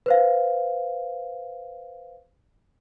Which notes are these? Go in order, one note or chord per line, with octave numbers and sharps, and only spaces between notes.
B4 C5 F5